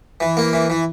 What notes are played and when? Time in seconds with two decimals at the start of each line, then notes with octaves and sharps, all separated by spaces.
0.20 E3
0.37 A#3
0.53 E3
0.70 E3